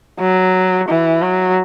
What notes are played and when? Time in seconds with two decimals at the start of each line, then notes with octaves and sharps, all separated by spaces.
0.20 F#3
0.88 E3
1.22 F#3